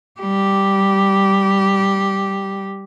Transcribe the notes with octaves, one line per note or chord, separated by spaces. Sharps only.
G3 G4